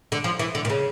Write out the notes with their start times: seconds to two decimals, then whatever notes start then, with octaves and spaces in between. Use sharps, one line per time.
0.12 D3
0.24 F3
0.39 E3
0.55 D3
0.65 A#2
0.70 C#3